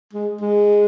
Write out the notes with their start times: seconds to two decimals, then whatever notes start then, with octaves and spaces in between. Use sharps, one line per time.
0.13 G#3
0.41 G#3